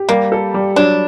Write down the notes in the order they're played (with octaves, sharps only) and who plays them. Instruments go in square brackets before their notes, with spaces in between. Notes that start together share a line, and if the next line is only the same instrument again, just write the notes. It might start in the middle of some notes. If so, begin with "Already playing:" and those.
Already playing: [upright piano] G4
[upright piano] G3 [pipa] A#3
[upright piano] A4
G3
[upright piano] F#3 [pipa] D4